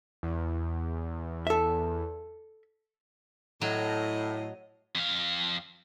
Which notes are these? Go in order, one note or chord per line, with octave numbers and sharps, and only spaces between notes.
E2
A4 E5
A2 F#3 D#5
F2 F5